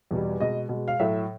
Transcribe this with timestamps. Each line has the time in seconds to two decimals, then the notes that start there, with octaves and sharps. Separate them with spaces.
0.11 E2 B2 G3
0.40 B2 G#3 D#5
0.69 B2 G#3
0.88 F5
0.99 A2 F#3 A3 E5